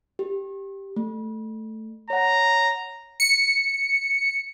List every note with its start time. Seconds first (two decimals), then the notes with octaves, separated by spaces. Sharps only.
0.19 G4
0.96 A3
2.10 C#5 F#5 A#5
3.20 C#7